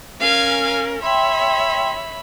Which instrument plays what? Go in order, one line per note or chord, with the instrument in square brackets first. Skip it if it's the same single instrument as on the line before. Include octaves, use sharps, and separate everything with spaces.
[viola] C#4 A#4 [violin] F5 G#5
[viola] C#5 E5 [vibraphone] G5 C6 [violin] B5